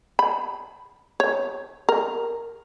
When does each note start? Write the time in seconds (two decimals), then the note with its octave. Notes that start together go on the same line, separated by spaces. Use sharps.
0.19 B5
1.20 C#5
1.89 A#4